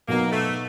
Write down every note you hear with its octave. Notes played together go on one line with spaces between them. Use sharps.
B2 F#3 A#3 B3 D#4
A3